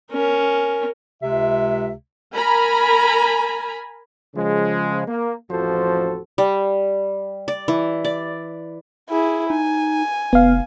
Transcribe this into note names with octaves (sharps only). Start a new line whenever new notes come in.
C#4 A#4
C#2 C3 G#3 E5
A#4 G#5 A#5 B5
C#3 F3 G#3
A#3
A1 F2 F3 F#4 A4 C5
G3
D5
E3
D5
E4 G#4
D#4 G#5
F1 B3 F5